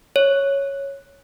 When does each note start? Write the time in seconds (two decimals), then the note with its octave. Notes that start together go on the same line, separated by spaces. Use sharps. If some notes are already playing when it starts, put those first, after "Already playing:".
0.16 C#5